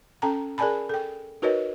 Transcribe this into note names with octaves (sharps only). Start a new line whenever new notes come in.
C#4 A4 G5 A5 A#5
G#4 A#4 D5 G#5 A5 B5
A4 G5
D#4 F#4 A#4 B4 C#5 D#5